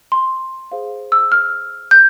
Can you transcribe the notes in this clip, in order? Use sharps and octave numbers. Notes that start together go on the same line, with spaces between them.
C6
G#4 C5 F5
E6
F6
G6